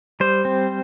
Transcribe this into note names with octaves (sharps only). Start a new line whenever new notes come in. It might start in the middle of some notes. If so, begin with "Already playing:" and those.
G3 C5
C4